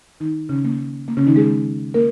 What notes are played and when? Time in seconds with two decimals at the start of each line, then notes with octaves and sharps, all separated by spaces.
0.20 D#3 D#4
0.49 C#3 C#4
0.65 A#3
1.08 A#3
1.17 C#3 C#4
1.26 D#3 D#4
1.36 G#3 G#4
1.94 A#3 A#4